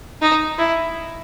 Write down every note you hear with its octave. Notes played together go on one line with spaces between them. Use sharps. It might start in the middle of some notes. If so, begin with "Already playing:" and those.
D#4
E4